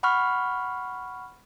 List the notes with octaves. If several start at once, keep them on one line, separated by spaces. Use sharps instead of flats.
F#5 B5 C#6 F6